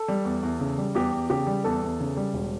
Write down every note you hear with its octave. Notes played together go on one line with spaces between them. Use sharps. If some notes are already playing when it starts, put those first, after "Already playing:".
Already playing: A4
G3
E2
E2
C#3
G3
E2 G4
E2
C#3 G4
G3
E2 A4
E2
C#3
G3
E1